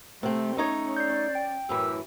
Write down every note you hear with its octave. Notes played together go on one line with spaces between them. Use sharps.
C3 A3 C4
A3 C#4 D#4 C#5
D5 G6 C7
G5
F#2 A2 E3 G4 A#4 E6